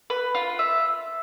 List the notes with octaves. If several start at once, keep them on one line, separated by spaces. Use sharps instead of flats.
B4
F4
E5